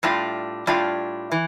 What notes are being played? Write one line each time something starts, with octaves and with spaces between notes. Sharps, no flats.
A2 G3 D4 F4
A2 G3 D4 F4
E3